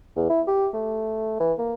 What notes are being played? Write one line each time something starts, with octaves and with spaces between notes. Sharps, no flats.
E2
E4
G4
A3
E3
A#3